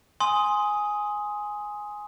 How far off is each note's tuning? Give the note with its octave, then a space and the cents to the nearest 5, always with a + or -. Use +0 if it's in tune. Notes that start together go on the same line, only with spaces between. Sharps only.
G#5 +0 C6 +0 D#6 +10